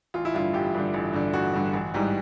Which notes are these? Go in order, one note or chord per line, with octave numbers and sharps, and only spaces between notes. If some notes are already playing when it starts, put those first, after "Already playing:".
A1 F4
E4
G2 D3 F4
A1 G4
G2 D3
A1
G2 D3
A1 F#4
G2 D3
A1
G#2 E3 G3